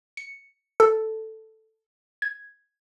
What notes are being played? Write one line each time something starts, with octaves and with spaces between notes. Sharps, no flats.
C#7
A4
G#6